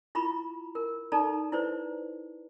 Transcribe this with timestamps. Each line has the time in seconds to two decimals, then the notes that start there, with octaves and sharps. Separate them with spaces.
0.15 E4 F4 A#5 B5 C#6
0.75 A#4
1.12 D#4 A4 D5 A5 A#5
1.52 E4 B4 C5 D5